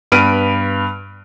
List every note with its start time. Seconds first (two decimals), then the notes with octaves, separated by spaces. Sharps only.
0.12 G2 B3 B5 F6 D7 D#7